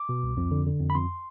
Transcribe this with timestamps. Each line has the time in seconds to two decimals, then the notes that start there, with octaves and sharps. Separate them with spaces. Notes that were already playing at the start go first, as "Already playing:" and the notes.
Already playing: D6
0.09 B2
0.23 C2
0.37 F2
0.51 D3
0.66 D3
0.80 F2
0.90 B5
0.95 F2 C6